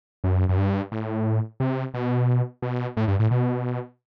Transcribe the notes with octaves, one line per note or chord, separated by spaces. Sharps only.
F#2
F#2
G2
A2
C3
B2
B2
A2
G2
A2
B2